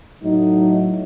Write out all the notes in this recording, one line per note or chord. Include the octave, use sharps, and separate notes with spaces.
A2 F#3 A3 D#4